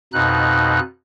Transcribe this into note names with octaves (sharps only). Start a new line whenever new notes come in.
F2 B2 D#4 F#6